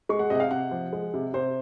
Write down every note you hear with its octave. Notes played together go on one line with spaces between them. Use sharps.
G#3 C#6
F#5
C3 D#5 F#5
F5
C3 F#5
F3
G#3
C3
C3 C5